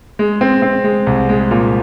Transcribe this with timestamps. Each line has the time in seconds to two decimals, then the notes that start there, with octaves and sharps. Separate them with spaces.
0.19 G#3
0.41 C4
0.62 C4
0.84 G#3
1.07 C2
1.29 G#3
1.51 A#2